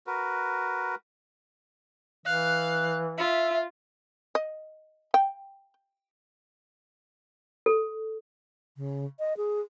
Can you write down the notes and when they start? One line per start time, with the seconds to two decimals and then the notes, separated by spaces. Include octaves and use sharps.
0.07 F#4 A#4 B4
2.26 E3 F5 F#6
3.18 F4 E5
4.35 D#5
5.14 G5
7.66 A4
8.77 C#3
9.19 D#5
9.37 G#4